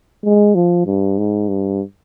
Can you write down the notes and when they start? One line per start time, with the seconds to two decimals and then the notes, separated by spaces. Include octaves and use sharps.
0.25 G#3
0.55 F3
0.86 G2
1.18 G#2
1.48 G2